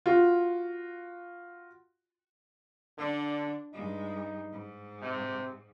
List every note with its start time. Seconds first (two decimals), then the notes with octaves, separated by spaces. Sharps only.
0.06 F4 F#4
2.98 D3 D4
3.73 G2 G#3 D#4
4.52 G#2
5.02 C3